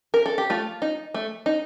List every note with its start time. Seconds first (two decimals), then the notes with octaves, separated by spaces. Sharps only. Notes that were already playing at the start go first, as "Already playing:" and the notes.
0.14 A#4
0.26 A4
0.38 G4
0.50 A3 F4
0.82 D#4
1.14 A3
1.46 D#4